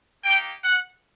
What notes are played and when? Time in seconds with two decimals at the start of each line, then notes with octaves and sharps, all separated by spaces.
0.24 A#3 D#4 G4 G5
0.63 F#5